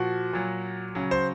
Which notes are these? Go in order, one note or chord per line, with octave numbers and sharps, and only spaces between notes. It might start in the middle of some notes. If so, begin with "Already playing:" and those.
Already playing: A#2 F3 F#4
A#2 F#3
C#3 F#3
C5